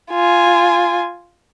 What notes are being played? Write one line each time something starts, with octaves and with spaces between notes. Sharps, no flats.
F4 G#5